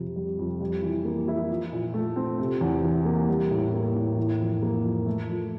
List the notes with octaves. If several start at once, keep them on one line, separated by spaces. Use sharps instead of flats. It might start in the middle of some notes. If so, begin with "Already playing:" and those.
Already playing: F2 C3
G3
F2
G3
E3
A#3
E4
F3
A#2
A3
C4
C3
E2
E3
A#3
G3
A2
A#3
A2
E3
F2
A#3
F2
A3
F3